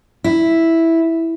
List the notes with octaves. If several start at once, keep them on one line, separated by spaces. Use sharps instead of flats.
E4